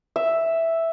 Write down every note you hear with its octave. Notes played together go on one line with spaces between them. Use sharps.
E5